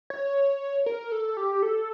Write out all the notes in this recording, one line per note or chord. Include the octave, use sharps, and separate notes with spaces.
C#5
A#4
A4
G4
A4